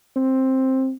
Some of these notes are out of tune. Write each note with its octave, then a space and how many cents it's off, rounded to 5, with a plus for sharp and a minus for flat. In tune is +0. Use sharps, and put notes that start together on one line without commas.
C4 +10